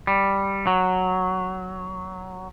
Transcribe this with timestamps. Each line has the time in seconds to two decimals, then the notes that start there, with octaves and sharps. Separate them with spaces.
0.07 G3
0.67 F#3